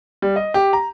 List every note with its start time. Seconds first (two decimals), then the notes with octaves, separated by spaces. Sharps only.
0.22 G3
0.36 D#5
0.54 G4
0.73 A#5